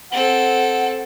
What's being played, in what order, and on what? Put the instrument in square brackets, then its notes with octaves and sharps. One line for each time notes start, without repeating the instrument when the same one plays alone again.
[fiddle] C4 A4 [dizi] F#5